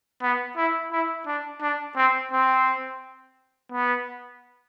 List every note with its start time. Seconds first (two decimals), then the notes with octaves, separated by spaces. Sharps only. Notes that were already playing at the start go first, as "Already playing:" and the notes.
0.22 B3
0.56 E4
0.92 E4
1.26 D4
1.61 D4
1.96 C4
2.31 C4
3.72 B3